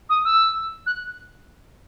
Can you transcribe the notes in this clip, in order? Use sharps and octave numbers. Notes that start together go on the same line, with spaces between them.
D#6
E6
F#6